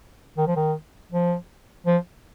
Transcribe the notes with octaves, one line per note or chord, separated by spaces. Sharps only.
D#3
F3
D#3
F3
F3